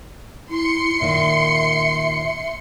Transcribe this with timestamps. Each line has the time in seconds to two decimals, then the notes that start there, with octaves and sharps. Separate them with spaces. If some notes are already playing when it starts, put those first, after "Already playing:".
0.50 E4 C6 C#7
1.00 D#2 A#2 D#3 E5